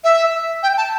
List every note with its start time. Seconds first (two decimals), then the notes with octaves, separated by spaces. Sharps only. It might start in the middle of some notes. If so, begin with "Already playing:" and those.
0.04 E5
0.63 G5
0.77 A5